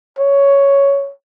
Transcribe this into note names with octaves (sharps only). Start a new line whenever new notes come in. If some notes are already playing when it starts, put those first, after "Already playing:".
C#5